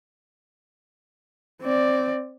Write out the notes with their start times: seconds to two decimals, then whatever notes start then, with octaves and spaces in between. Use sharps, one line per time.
1.61 C4 D5